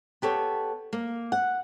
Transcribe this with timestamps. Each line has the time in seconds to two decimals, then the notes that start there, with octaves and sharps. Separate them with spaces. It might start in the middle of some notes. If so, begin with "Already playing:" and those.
0.22 B3 G4 A4 C#5
0.93 A#3
1.32 F#5